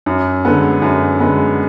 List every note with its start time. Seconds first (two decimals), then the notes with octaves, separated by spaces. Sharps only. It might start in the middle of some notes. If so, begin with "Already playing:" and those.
0.06 F#2
0.45 D3 G#3 B3
0.82 F#2
1.20 D3 G#3 B3